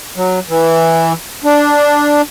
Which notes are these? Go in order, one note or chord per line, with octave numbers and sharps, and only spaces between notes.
F#3
E3
D4